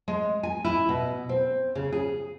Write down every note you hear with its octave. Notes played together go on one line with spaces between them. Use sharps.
G#3
G#5
E4
B2
C4
C#3
G#4